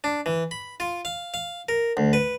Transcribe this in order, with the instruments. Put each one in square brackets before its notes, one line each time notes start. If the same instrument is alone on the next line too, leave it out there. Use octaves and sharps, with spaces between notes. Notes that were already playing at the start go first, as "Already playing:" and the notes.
[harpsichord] D4
E3
B5
F4
F5
F5
A#4
D2
B4